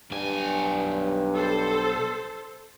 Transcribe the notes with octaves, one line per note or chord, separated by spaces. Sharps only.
B1 G2 G#5
A4 C5